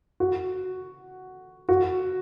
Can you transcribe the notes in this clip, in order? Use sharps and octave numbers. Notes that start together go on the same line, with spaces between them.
F#4
F#4